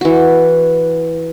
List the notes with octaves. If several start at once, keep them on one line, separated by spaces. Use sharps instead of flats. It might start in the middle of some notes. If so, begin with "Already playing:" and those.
E3 F#4